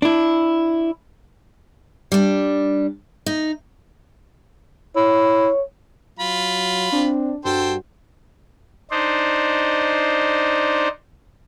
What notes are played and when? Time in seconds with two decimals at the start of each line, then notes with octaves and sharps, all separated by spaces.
0.02 D4 E4
2.12 G3 D4
3.26 D#4
4.96 E4 C#5
6.19 F#3 F4 B5
6.92 C4 D4
7.45 G2 F#4 A4 C5 G5
8.91 D4 D#4 C5